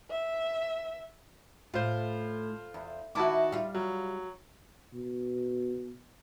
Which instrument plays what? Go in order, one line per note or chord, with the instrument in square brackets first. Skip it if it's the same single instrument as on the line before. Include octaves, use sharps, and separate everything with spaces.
[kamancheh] E5
[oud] A2 [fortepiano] F4 C5
[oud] E2
[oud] D#3 E4 [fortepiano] F#4 A5 D6
[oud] G3 F4
[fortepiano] F#3
[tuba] B2